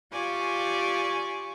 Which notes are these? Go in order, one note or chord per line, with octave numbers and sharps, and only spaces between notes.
F4 G4 D5 G#5 C#6